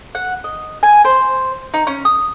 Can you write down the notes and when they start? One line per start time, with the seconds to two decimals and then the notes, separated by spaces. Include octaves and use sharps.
0.15 F#5
0.44 D#5
0.83 G#5
1.05 C5
1.74 D#4
1.87 C#4
2.05 D#6